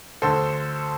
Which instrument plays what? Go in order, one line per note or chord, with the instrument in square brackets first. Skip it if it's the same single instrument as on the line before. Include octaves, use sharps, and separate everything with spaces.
[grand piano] D2 D3 A4 C5